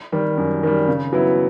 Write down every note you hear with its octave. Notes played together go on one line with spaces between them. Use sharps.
D#3 G3
F#2
D#3 G3
C#3
F#3 B3 E4